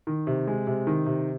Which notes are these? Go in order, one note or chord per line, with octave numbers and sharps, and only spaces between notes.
D#3
C3
G#3
C3
D#3
C3